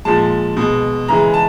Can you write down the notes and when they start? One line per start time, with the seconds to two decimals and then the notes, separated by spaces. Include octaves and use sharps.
0.05 A#2 F3 G#3 A5
0.57 B2 G#3
1.08 C#3 E3 G#3 A#5
1.34 A5